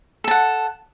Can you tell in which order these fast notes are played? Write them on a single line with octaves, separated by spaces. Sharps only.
A4 A5 F#5